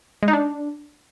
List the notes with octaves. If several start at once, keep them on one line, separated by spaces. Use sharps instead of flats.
G#3
D#4
D4